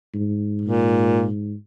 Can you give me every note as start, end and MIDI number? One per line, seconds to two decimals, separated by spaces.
0.14 1.55 44
0.61 1.28 46